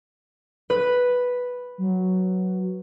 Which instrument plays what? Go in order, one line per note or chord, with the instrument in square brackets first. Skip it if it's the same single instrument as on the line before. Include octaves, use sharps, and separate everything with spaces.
[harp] B4
[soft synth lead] F#3